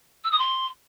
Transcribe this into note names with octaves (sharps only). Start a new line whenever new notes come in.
E6
D#6
C6